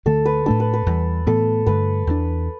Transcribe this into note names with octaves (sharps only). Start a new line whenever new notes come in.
D2 D3 A3 A4
B4
A2 A3 D4 A4
B4
B4
E2 E3 G3
A2 E3 B3 A4
G2 D3 A3 B4
E2 E3 A3 D4